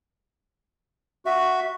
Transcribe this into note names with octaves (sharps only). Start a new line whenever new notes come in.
F#4 E5